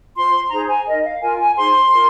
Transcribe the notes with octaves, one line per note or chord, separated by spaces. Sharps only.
F4 C5 C6
D#4 G#4 C5 A#5
G#5
D#4 A#4 D#5
F5
F4 A#4 G#5
G#5
D#4 G#4 C5 C6
F4 A#4